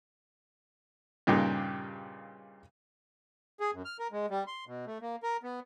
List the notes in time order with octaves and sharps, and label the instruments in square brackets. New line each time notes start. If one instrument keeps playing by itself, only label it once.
[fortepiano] G2 A#2 C#3 D#4 G4
[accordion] G#4
F#2
F6
A#4
G#3
G3
C6
B2
A3
A#3
A#4
B3